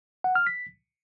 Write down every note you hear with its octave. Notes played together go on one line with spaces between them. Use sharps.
F#5
F6
B6